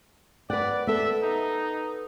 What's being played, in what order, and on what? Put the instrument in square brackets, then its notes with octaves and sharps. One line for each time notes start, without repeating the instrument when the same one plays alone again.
[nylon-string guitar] B4 F#5 [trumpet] D5
[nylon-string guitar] B3 A4 [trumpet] E5
[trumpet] D#4